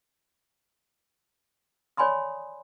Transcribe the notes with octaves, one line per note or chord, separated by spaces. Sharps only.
C#5 D5 G#5 B5 C6 D#6